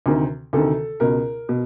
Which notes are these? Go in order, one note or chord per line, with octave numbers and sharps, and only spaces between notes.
D2 C3 D#3
D2 C3 D#3 A4
C#2 B2 A#4
B2